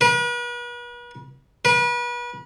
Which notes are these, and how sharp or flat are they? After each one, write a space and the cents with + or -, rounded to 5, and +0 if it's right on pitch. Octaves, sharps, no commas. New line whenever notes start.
B4 -40
B4 -35